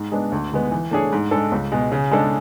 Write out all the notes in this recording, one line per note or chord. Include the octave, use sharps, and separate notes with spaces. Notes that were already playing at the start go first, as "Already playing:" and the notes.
Already playing: G#2
G#3 B3 D4
D2
D3 G#3 B3
E3
A3 D4 G#4 C#5
G#2
G#3 D4 A4
C#2
B2 G#3
C#3
G#3 D4 A4